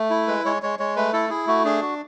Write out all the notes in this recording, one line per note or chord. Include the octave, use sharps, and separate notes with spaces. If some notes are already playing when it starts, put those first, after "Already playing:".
Already playing: A3
E4
G#3 B4
G#3 C#5
G#3 C#5
G#3 C#5
A3 B4
E4 A4
E4 G#4
A3 F#4
D4 G#4
F#4